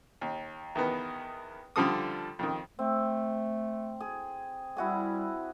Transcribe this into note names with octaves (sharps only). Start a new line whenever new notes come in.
D#2
E2 D#3 B3
D3 F3 G3 A4 D#6
F2 D#3
A3 C4
G#4
G3 E4 F#4 G#4